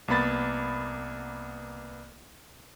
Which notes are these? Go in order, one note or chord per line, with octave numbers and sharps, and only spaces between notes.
C2 A#3 B3 B5 A6